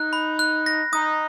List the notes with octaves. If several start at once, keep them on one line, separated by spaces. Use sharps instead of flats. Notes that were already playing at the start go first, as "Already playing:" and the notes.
Already playing: D#4 F#6
B5
F#6
A#6
D#4 D#6